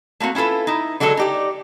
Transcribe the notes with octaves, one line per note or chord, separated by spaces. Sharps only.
A3 A#3 C4 F#4
C#4 E4 F4 A4 B4
D#4 E4
D3 F#3 G#3 G#4 A4
D#4 G4 D5